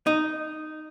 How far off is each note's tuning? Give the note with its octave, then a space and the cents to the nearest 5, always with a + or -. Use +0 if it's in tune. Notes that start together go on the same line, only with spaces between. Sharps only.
D#4 -5